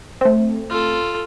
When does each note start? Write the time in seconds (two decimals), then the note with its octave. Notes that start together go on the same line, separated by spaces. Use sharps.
0.21 A3 C4
0.70 F4 A4